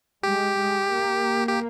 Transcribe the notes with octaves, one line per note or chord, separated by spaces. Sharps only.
G#3 G4
G#3
A#3
G4